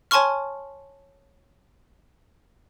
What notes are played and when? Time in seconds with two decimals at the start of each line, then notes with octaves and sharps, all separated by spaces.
0.11 C#5 G#5 A5 C6 C#6 F6